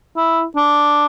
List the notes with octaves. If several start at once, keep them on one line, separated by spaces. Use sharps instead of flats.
E4
D4